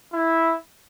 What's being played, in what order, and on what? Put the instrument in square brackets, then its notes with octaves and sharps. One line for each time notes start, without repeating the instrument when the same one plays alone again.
[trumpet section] E4